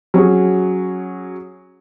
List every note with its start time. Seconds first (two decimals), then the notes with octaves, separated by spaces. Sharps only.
0.14 F#3 C#4 F#4 G#4